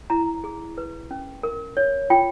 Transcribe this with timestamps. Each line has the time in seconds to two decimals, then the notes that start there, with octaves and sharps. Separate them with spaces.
0.10 E4 A#5
0.44 G#4
0.78 B4
1.11 C#4
1.43 A#4
1.77 C#5
2.10 F4 G5